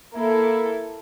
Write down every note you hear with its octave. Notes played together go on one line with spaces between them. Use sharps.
A#3 E4 A4